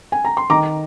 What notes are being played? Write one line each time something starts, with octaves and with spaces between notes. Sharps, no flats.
G#5
A#5
C6
D#3 A#5 D6